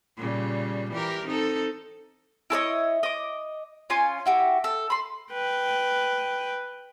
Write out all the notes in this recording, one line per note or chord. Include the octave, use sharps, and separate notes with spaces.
A#2 C#3 G3
E3 G4 A#4
C4 D#4 A4
E4 A4 C#5 D#5
D#5 D6
C#4 F4 G#5
E4 F#4 G4
A4
B5 C6
B4 G5